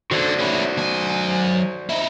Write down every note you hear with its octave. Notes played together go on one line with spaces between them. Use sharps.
D3 F#4 C5 D5
C#4 E4
F#3 G#5
D#4 E4